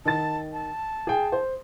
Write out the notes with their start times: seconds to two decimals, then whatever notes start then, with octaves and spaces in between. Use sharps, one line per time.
0.05 D#3 A5 A6
0.53 A5
1.07 G#4 G5
1.32 C5